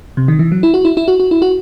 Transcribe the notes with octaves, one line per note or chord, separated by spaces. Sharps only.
C3
D#3
E3
F#3
E4
F#4
E4
E4
F#4
F#4
E4
F#4